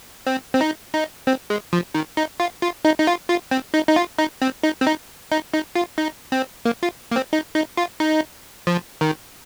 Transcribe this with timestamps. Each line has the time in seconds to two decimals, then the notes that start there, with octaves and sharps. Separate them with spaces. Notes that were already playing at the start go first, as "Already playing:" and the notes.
0.27 C4
0.54 C4
0.61 D#4
0.94 D#4
1.27 C4
1.50 G#3
1.73 F3
1.95 D#3
2.17 D#4
2.40 F4
2.62 F4
2.85 D#4
2.99 D#4
3.07 F4
3.29 F4
3.51 C4
3.74 D#4
3.89 D#4
3.96 F4
4.19 D#4
4.42 C4
4.63 D#4
4.81 C4
4.87 D#4
5.32 D#4
5.54 D#4
5.76 F4
5.98 D#4
6.32 C4
6.65 A#3
6.83 F4
7.11 A#3
7.16 C4
7.33 D#4
7.55 D#4
7.77 F4
8.00 D#4
8.67 F3
9.01 D#3